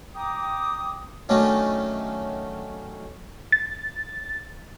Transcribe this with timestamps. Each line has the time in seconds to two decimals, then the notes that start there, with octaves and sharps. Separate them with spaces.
0.16 G5 A#5 D6 D#6
1.29 D#3 F#3 A3 C#4 D4
3.52 A6